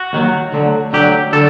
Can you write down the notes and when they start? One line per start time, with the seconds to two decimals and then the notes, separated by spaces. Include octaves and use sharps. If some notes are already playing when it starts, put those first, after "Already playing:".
Already playing: F#4
0.13 D#2 D#3 F#3
0.52 D2 D3 F#3
0.93 D2 D3 F#3 G4
1.33 D3 F#3 A4